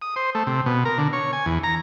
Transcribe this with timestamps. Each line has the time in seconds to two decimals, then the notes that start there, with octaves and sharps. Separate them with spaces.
0.02 D#6
0.16 C5
0.35 A3
0.47 C3
0.66 B2
0.85 A#4
0.98 D3
1.13 C#5
1.33 G#5
1.46 E2
1.64 A#5